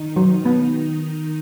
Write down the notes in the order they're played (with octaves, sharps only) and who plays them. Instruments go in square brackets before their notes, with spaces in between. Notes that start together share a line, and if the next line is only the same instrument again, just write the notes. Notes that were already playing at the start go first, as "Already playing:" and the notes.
Already playing: [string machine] D#3 D#4
[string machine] D#3 D#4 [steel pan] F#3
[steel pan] B3